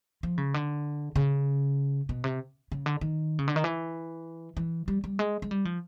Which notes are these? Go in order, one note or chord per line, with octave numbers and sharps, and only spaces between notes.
F3
C#3
D3
C#3
B2
C3
C#3
D3
D#3
C#3
D3
D#3
E3
E3
G3
G3
G#3
G#3
G3
F3